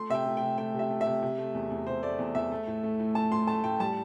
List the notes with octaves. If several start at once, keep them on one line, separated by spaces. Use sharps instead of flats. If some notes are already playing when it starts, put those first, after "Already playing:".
Already playing: A3 C6
C3 E5
G5
A3
C3 G5
A3 G5
C3
E5
A3
E5
C3
C3
A3
E2
E2
C3 C5
A3 D5
E2
E2 E5
A3
A2
A3
A2
A3 A5
A2 C6
A3 A5
A2 G5
G3 A5